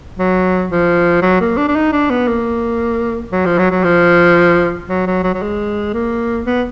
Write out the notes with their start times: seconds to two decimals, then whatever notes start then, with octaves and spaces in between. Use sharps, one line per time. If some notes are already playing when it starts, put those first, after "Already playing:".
0.19 F#3
0.71 F3
1.22 F#3
1.41 A#3
1.57 D4
1.68 D4
1.76 D#4
1.92 D4
2.10 B3
2.28 A#3
3.32 F#3
3.46 F3
3.58 F#3
3.71 F#3
3.84 F3
4.89 F#3
5.07 F#3
5.23 F#3
5.34 F#3
5.42 G#3
5.93 A#3
6.46 B3